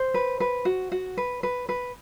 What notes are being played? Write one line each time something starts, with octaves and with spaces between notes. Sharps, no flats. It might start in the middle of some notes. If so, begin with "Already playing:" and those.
Already playing: C5
B4
B4
F#4
F#4
B4
B4
B4